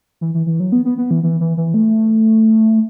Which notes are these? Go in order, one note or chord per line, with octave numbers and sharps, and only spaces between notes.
E3
E3
E3
F#3
B3
B3
B3
E3
E3
E3
E3
A3